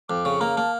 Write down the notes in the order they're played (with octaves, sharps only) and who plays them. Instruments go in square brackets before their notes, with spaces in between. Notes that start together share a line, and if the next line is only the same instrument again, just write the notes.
[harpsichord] F2 [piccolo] D6
[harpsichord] C#3 [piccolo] C#6
[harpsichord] A#3 [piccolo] A#5
[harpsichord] A#3 [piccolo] A5